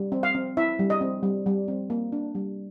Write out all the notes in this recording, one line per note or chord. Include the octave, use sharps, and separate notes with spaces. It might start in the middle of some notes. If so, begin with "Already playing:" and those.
Already playing: G3
C4
F5
C4
E4 E5
G3
D#5
C4
G3
G3
C4
A#3
D4
G3